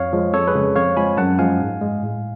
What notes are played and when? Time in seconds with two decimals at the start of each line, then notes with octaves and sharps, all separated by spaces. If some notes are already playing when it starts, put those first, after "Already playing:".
Already playing: F2 C#5 F5
0.13 F3 G#3
0.33 F2 A4 C#5
0.48 G#4 B4
0.55 C#3 G#3
0.75 F2 C#5 F5
0.97 F3 G#3 G#5 B5
1.17 F#2 F#5 A5
1.39 F3 G#3 F5 G#5
1.60 G#2
1.81 G#3
2.02 A2